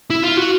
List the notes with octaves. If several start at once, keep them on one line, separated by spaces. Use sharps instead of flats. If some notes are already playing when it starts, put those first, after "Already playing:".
E4
F4
F#4